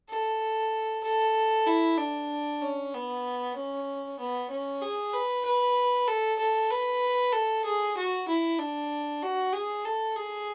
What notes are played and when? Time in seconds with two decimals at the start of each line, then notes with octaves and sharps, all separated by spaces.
0.10 A4
1.03 A4
1.67 E4
1.98 D4
2.62 C#4
2.93 B3
3.56 C#4
4.19 B3
4.50 C#4
4.82 G#4
5.13 B4
5.45 B4
6.08 A4
6.39 A4
6.70 B4
7.33 A4
7.64 G#4
7.97 F#4
8.28 E4
8.59 D4
9.22 F#4
9.53 G#4
9.85 A4
10.16 G#4